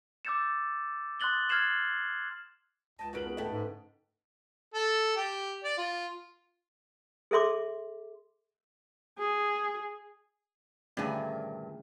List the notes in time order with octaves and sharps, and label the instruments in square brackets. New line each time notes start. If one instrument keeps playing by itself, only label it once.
[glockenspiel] D6 E6 G6 A6 C#7 E7
C6 D#6 F#6 A6 F#7 G7
F6 G#6 A6 C7 E7 F#7
[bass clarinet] C#2 [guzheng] D#5 G5 [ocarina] A5
[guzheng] C#3 D#4 F#4 [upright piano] A#4 D7 F#7 [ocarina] B4
[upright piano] B3 G#4
[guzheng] A2 A3 [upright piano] D#5 G5
[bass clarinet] G#2
[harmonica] A4
G4
D5
F4
[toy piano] G#4 A4 E5 C6 D6
[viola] G#4
[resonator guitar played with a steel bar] G2 A#2 [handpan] D3 A3 C#4 [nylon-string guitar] D#3 G#4 G#5